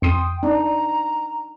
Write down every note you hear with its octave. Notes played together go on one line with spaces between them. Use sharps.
F2 G5 C6 D#6
D4 D#4 A#5